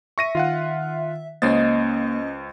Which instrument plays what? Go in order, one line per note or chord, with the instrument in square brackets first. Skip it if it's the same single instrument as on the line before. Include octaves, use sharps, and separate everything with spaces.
[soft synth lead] E5 [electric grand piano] C#6 A#6 D#7
[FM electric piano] D#3 [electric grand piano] F4 F5 F#5
[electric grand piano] C#2 C5 A6 [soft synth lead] A#3 [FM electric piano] C#4 D#5